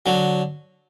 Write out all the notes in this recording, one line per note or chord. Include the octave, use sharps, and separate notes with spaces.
D3 F#3